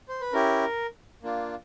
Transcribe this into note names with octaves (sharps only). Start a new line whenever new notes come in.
C5
B4
C#4 E4 G4 A#4
A#3 D4 F4